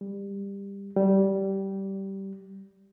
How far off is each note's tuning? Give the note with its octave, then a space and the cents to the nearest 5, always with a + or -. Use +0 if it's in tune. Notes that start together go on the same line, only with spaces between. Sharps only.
G3 +20
G3 -15